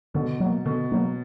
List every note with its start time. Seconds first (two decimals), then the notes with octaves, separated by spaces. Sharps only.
0.14 B2 D3
0.40 F#3 A#3
0.66 B2 D3
0.92 F#3 A#3